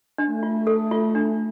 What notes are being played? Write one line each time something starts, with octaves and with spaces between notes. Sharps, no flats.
D4
A3
F4
A4
F4
D4